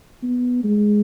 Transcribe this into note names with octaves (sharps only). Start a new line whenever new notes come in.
B3
G#3